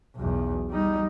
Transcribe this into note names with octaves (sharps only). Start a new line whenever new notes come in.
B1 E2
G3 D#4